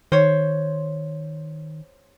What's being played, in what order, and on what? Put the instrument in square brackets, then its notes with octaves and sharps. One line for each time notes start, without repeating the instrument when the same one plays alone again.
[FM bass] D#3 [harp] C5 C#5